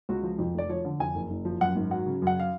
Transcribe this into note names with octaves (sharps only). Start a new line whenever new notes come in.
C#2 F#4
F3
F2
F1 D5
F3 C#5
D3
F2 G#5
F#1
F#1
F3
F#2 F#5
G#1
F#3 F#5
C#3
F#2 F#5
F5